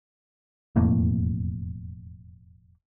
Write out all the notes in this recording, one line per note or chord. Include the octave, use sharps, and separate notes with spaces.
E1 F2 A2 A#3